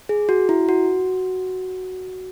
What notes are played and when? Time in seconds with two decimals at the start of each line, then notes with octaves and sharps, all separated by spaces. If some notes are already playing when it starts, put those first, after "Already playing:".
0.09 G#4
0.29 F#4
0.49 E4
0.69 F#4